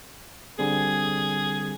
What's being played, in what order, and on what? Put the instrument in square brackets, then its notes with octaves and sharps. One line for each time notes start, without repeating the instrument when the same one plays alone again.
[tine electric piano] D3 G3 C4 [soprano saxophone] G#4